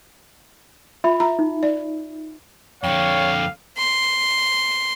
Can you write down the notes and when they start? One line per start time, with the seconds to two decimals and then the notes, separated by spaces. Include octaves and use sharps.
1.04 F4 E5 B5
1.20 F4 A#5
1.39 D#4
1.63 D5
2.84 F2 D3 C#5 F5 G5
3.78 C6